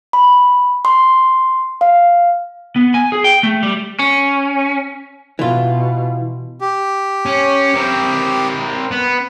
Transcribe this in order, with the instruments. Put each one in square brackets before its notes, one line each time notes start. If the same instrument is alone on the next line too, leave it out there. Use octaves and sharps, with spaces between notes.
[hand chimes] B5
C6
F5
[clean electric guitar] B3
G#5
G#4
G5
A3
G3
[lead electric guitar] C#4
[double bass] B2 [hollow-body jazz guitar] E3 F4
[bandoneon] G4
[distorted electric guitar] C#4
C4 A#4
B3